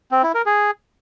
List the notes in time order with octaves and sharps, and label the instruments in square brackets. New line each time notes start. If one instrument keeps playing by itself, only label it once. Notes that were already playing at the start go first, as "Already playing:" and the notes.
[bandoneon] C4
E4
A#4
G#4